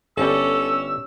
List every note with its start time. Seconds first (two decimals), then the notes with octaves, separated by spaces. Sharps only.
0.17 G1 G3 C#4 A4 E6